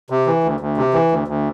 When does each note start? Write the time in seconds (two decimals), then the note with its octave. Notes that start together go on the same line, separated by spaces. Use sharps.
0.10 C3
0.27 E3
0.44 D2
0.60 D2
0.77 C3
0.94 E3
1.11 D2
1.28 D2